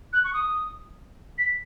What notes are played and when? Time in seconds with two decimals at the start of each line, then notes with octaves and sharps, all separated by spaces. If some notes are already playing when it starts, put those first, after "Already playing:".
0.13 F#6
0.24 C#6
0.33 D#6
1.38 B6